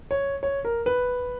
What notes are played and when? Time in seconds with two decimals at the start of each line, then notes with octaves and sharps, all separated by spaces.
0.11 C#5
0.43 C#5
0.65 A#4
0.86 B4